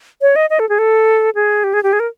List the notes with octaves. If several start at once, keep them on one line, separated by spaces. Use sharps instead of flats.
C#5
D#5
D#5
A4
G#4
A4
G#4
G4
G#4
G4
G#4
A#4